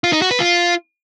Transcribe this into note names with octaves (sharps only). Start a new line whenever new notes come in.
F4
D#4
F#4
B4
F4